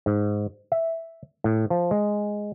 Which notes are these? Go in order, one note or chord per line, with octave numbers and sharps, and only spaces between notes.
G#2
E5
A2
F3
G#3